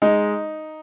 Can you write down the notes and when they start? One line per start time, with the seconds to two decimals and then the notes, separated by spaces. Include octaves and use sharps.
0.02 G#3 D#4